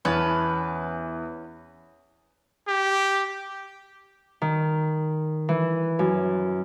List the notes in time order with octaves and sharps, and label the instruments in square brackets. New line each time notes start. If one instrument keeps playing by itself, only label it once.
[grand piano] E2 [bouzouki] C#4 B4 A5
[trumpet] G4
[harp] D#3
E3
F#2